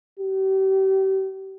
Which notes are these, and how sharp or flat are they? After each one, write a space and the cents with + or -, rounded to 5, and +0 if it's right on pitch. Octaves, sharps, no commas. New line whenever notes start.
G4 -35